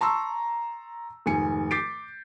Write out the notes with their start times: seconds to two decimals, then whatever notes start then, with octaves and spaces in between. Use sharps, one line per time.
0.01 A5 A#5 C6 C#6 E6
1.26 F1 G#2 D#3 G#5 C#7
1.71 D6 G6 A6 B6 C7 D7